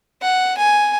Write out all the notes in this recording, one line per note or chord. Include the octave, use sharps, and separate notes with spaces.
F#5
G#5